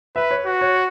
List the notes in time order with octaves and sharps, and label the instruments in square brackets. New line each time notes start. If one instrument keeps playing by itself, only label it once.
[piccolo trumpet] B4 [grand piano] E5
[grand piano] C#5
[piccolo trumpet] F#4
[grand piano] C#5